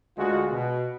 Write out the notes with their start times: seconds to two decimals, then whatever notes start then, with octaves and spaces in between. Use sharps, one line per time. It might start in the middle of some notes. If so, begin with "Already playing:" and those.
0.18 D2 G#3 F4 F#4
0.51 B2